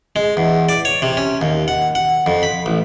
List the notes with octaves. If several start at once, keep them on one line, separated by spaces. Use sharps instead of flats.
G#3
E2
D5
C#5
C3
C#4
D#2
F#5
F#5
F2
B5
A1